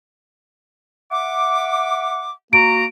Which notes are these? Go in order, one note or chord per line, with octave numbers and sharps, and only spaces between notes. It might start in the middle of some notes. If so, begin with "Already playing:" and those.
E5 F#5 D6
A#3 F#4 A#5 D7